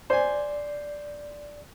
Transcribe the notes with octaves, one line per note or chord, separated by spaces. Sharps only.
C5 D5 G#5